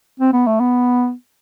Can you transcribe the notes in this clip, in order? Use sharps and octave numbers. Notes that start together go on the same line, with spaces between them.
C4
B3
A3
B3